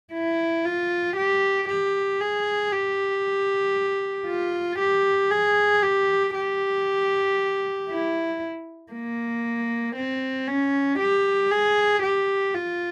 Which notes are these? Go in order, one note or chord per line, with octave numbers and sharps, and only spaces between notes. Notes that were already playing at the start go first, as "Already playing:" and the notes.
E4
F4
G4
G4
G#4
G4
F4
G4
G#4
G4
G4
E4
A#3
C4
C#4
G4
G#4
G4
F4